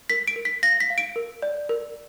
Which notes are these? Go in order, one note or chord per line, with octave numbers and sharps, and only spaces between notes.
A#4 B6
D7
A#4
B6
F5 A#6
B6
F5
D7
A#4
D5
A#4